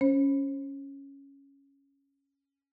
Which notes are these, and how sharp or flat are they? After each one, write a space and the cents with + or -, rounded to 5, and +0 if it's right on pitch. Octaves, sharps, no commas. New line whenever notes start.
C#4 +0 C5 +35